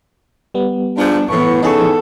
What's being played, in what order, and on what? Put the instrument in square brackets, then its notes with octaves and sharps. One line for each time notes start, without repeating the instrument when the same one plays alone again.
[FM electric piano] G3 B3
[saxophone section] G#2 F3 [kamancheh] D4
[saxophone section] A2 [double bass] E3 B3 [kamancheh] C#6
[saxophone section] C#3 [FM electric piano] D#4 G#4 C#6 [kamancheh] A4